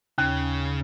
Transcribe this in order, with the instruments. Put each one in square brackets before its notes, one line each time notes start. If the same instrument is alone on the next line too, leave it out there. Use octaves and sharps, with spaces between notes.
[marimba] D#2 [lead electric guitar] C#3